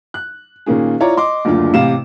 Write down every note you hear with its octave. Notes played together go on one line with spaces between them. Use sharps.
F#6
A#2 D#3 A#3 C#4 G#4
E4 F4 C#5 D5 A#5
D#5 C6 D6
F#1 D2 D3 D4 F4
A1 C3 F5 E7